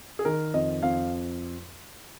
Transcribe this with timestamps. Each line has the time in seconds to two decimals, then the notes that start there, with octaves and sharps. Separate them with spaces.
0.19 G#4
0.25 D#3 A#4
0.54 F2 D#5
0.83 F2 F5